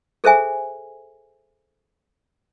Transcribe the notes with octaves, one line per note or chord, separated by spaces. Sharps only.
G#4 A4 C5 E5 G#5